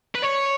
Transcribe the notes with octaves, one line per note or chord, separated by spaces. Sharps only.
B4
C#5